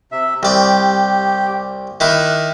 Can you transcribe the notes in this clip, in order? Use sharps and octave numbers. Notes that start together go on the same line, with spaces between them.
C3 E5
C2 G4 D5
D#3 E4 D6 F#6